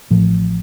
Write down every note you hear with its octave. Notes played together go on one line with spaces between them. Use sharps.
A1 A2 F3